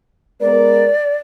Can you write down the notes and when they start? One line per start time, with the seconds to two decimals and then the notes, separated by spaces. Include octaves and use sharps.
0.41 G#3 B3 A#4 D5